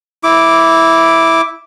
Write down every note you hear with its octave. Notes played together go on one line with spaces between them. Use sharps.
E4 D6